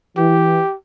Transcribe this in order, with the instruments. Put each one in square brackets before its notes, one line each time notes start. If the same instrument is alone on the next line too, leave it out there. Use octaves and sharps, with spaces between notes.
[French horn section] E3 [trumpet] G4